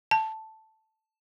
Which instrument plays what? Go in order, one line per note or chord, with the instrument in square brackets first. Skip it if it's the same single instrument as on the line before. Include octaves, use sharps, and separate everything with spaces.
[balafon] A5